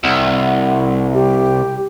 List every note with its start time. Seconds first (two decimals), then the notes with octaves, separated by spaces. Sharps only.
0.04 C2 F#5
1.14 G4